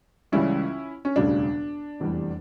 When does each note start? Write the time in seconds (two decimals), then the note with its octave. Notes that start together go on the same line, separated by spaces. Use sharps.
0.32 C#2 C#3 E3 G3 C#4 E4
1.05 C#4
1.16 E1 D2 C#3 G3 D4
2.00 F1 E2 E3 G3